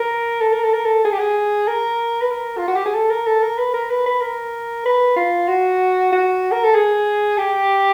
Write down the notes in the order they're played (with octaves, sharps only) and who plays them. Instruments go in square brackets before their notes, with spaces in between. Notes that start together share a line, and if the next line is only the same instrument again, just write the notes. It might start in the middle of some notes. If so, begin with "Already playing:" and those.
Already playing: [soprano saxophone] A#4
A4
A#4
A4
A#4
A4
G#4
G4
G#4
A#4
B4
A#4
F4
F#4
G4
G#4
A4
A#4
A4
A#4
B4
A#4
B4
B4
A#4
B4
F4
F#4
F#4
A#4
A4
G#4
G4